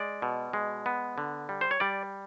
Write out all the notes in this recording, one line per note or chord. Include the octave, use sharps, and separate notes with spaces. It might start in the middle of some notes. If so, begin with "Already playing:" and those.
Already playing: G#3 D5
B2
G#3
B3
D3
G3
C5
C#5
G3 D5